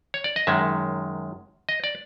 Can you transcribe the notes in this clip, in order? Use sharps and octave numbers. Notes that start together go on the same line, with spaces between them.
C#5
D5
D#5
F#2 D#3 G#3 E5
D#5
D5